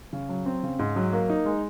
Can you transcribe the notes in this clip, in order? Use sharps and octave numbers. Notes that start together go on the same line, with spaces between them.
C#3
F#3
C4
C#3
G#2
F#3
A#3
D#4
G#3